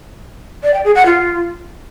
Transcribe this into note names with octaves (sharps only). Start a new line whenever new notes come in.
D5
G5
G#4
F#5
F4